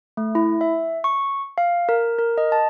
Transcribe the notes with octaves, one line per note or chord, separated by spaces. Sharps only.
A3
E4
E5
C#6
F5
A#4
A#4
D#5
A5